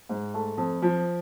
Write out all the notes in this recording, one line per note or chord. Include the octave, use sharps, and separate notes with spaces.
G#2
A3
F2
F3